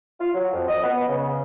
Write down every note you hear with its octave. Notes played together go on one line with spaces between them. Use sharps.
F4
F#3
F2
D#5
B3
C#3